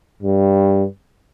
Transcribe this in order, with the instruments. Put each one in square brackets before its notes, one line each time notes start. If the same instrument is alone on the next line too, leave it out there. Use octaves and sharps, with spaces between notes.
[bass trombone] G2